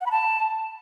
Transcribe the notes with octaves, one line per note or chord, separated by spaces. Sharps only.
F#5
B5
A5